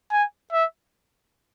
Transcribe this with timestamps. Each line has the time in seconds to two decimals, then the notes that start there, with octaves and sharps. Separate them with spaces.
0.12 G#5
0.53 E5